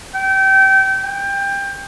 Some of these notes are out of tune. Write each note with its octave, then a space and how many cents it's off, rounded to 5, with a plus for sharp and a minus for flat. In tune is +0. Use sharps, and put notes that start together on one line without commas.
G5 -25
G5 +20